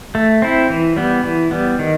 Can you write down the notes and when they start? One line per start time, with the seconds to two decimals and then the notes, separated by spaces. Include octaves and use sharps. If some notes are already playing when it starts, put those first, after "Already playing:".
0.15 A3
0.42 C4 E4
0.70 E3
0.96 G3 B3
1.24 E3
1.51 G3 B3
1.79 D#3